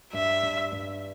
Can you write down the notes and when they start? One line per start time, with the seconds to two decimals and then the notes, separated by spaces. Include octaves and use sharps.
0.13 G2 E5
0.42 G2
0.72 G2